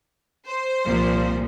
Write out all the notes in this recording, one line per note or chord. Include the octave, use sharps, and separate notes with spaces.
C5
C2 A#2 F3